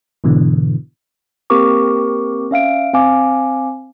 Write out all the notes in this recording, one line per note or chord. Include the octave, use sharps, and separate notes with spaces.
G#2 B2 D3 E3
A#3 C4 G4 A#4 C#6 D6
C#4 E5 F5 D7
C4 F5 G#5 D6